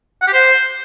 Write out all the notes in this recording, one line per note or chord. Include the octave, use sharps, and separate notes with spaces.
F#5
G4
C5